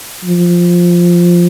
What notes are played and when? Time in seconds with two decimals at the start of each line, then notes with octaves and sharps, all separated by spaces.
0.24 F3